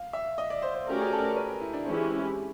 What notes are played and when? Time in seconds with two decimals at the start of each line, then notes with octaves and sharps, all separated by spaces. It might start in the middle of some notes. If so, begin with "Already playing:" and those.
Already playing: F5
0.13 E5
0.38 D#5
0.50 D5
0.62 C5
0.74 C5
0.88 A3 C#4 F#4 G4 A#4 D5
1.01 G#4
1.13 A4
1.24 A#4
1.36 B4
1.49 A#4
1.61 E4
1.73 D4
1.85 E3 G#3 C4 C#4 E4 G4